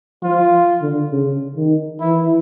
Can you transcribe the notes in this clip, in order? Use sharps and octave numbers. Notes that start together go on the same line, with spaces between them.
F3 F4
D3
C#3
D#3
E3 E4